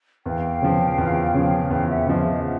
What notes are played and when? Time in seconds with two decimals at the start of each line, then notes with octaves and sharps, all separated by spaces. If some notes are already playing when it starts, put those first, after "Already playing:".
0.25 E2 F5 G5
0.62 C#3 F3
0.98 E2
1.34 C#3 F3
1.70 E2 F5 G5
1.88 E5 F#5
2.06 C#3 F3 D#5 F5
2.25 D#5 F5
2.43 E5 F#5